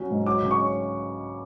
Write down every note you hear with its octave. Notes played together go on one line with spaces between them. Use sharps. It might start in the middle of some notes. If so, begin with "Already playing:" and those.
Already playing: F#3 C#4
G#2
F#3 D6
C#3
C#6
C#4